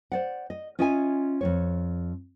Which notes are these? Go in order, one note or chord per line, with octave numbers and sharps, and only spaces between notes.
C5 D5 F#5
D#5
C#4 F4 D#5 E5 G5 G#5
F2 G#2 C#5